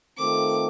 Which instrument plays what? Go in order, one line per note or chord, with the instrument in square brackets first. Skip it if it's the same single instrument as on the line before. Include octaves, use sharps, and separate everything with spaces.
[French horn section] D#3 A3 C4 F4 A4 [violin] D6